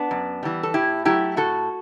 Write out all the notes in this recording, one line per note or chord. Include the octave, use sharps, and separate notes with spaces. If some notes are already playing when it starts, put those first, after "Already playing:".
Already playing: B3 D4
F#2
E3 G3
A4
A2 E4 G4
F#3 A3 E4 G4
A2 F#4 A4